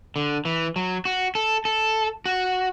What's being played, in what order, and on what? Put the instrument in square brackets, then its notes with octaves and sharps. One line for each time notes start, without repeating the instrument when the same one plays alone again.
[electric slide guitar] D3
E3
F#3
F#4
A4
A4
F#4